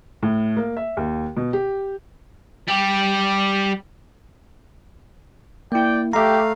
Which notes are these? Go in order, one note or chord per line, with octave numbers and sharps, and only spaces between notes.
A2
A#3
E5
D#2
B2
G4
G3 G4
A#3 E4 D5 G5
A3 G4 E5 F5 A#5